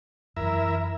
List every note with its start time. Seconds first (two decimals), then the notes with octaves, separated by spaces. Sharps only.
0.37 F#2 E3 E4 A#4 E5